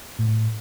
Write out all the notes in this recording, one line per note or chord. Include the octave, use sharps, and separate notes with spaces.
A2